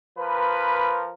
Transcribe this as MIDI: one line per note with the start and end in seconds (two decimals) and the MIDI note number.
0.18 1.13 53
0.18 1.13 70
0.18 1.13 71